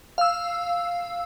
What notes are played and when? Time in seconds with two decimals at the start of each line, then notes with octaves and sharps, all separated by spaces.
0.18 F5 E6